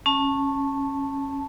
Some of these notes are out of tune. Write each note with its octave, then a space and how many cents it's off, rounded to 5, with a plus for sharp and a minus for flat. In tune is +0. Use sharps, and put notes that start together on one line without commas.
C#4 -15 A5 +0